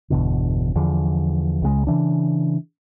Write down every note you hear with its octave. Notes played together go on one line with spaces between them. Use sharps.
G1 E2 B2 D3
E2 D3 F3
C#2 C#3 G3 G#3
C#3 E3 D4